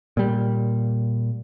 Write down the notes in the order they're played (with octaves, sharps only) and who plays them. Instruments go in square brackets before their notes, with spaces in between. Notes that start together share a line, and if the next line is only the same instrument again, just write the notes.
[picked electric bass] A#2 G3